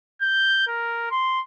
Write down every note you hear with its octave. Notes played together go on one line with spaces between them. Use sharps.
G6
A#4
C6